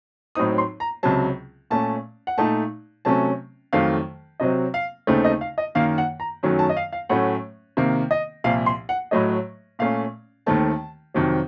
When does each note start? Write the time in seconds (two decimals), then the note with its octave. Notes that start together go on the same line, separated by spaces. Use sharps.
0.35 A2 F#3 C4 D#4 D#6
0.58 C6
0.80 A#5
1.03 C#2 C3 F#3 A5
1.70 A#2 A3 C#4 A5
2.27 F#5
2.38 A#2 A3 D#4 A5
3.05 C3 F#3 A3 C#4 A5
3.73 F2 D#3 F#3 A3 F5
4.40 C3 F#3 C4 D#5
4.74 F5
5.07 D#2 C#3 A3 C4 D#4
5.24 D#5
5.41 F5
5.58 D#5
5.75 F#2 D#3 A#3 F5
5.98 F#5
6.20 A#5
6.43 F#2 D#3 F#3 A3 C#4
6.59 A5
6.69 D#5
6.77 F5
6.93 F5
7.09 A2 F#3 A3 C#4 F#5
7.77 C3 D#3 A#3
8.11 D#5
8.44 C2 A#2 F3 F5
8.66 C6
8.89 F#5
9.11 A2 F#3 A3 D#5
9.79 A#2 A3 C#4 F5
10.46 D#2 D#3 A3 C4 A5
11.14 F2 C3 D#3 F#3 C4